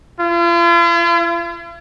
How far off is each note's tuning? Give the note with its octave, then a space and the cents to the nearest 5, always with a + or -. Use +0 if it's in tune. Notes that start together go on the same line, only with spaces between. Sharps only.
F4 -45